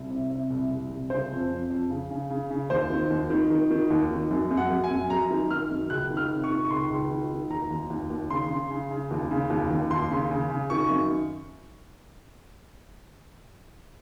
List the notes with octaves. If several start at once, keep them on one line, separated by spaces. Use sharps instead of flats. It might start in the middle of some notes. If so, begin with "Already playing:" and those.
Already playing: C2
C3
C3
C2
C2
C2
C#3 C5
F2
F2
F2
C#3
C#3
C#3
C#3
D#2 C5
D#3
D#2
D#3
D#3
D#3
D#2
D#3
F#2
F#2
F#5
F#2
G#5
F#2
F#2 A#5
D#3
D#3 F6
F#2
C#2 F#6
D#3
F6
C3
C#6
D#3
C#6
C#2 C6
C#2
D#3
D#3
D#2 A#5
D#2
D#2
D#2
C#3 C6
C#3
C#3
C#3
D#2
C#3
D#2
D#2
D#2 C6
C#3
C#3
C#3
D#3 C#6
F#2